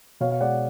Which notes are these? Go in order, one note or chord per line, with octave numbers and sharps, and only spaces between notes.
B2 C#5 F5
F5
G#3 D5 F#5